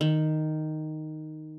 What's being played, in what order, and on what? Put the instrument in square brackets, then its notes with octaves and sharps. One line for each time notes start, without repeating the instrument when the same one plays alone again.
[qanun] D#3